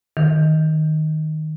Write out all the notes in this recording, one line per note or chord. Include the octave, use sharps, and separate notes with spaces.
D#3